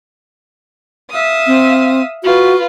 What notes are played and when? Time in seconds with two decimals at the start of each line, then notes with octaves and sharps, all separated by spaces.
1.11 E5 F5 D#6
1.47 C4
2.23 F4 F#4 B4